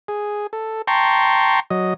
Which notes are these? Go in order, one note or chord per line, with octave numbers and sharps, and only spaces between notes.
G#4
A4
G5 A5 A#5 C6 C#6
F#3 D#5